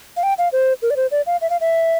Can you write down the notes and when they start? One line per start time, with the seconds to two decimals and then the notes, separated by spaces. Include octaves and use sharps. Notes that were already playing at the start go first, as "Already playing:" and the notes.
0.17 F5
0.23 G5
0.38 F5
0.53 C5
0.82 A#4
0.91 D5
0.96 C5
1.11 D5
1.26 F5
1.41 E5
1.50 F5
1.61 E5